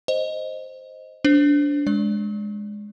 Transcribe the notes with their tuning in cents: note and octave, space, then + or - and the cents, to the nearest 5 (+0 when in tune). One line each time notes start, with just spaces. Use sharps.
C5 +0 D#5 +0
D4 -20 C5 +0
G#3 +0 D5 -25